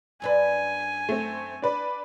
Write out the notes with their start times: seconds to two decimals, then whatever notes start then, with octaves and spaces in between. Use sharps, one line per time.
0.22 F#2 D4 B4 G#5
1.09 A3 C4
1.62 D4 B4 D5